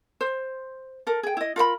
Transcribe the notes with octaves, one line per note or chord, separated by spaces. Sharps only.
C5
A4 A#4
G#4 G5
E4 D#5
F4 A#4 F#5 B5